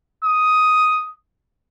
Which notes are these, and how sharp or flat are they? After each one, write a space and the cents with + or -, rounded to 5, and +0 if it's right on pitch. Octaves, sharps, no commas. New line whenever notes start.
D#6 +5